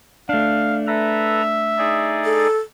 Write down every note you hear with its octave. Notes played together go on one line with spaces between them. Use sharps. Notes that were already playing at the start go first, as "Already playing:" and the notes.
A3 D4 F5
A4 B4 E5 A#5
D#4 G#4 D5
A4